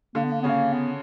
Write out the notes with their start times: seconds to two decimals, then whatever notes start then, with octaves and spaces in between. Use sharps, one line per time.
0.15 D3 A#3
0.24 B3
0.33 A#3
0.42 C#3 B3 C#4
0.50 A#3
0.74 B3